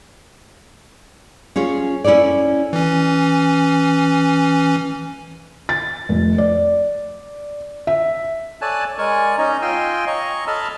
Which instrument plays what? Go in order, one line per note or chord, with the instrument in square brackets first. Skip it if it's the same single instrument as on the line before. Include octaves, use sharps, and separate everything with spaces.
[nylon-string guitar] C#4 F4 G#4 C#5
C#4 E4 A4 C#5 D5
[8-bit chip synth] E3 C#4
[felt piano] A6
F1
D5
E5
[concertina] A4 C#5 D5 G#5 A5 F#6
G#3 A#4 C#5 D5 G#5 C#6
C#4 D#4 C#5 D#5 A#5
F4 D#5 G5 G#5 C6 E6
C#5 D#5 A#5 C#6
A4 D#5 A5 B5 E6 F6